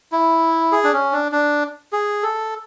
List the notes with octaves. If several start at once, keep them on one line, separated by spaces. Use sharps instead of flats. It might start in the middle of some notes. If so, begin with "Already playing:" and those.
E4
G#4
D4
C#4
D4
D4
G#4
A4